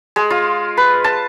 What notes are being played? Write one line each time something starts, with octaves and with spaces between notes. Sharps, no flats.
G#3
F4
B4
A5